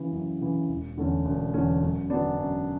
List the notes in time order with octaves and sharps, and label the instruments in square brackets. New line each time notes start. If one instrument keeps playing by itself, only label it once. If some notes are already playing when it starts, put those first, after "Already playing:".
Already playing: [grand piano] C#3 E3
F#2
C#3 E3
E1
E2 D3 A3 C#4
E1
E2 D3 A3 C#4
F#2
D3 F#3 B3 D4
F#2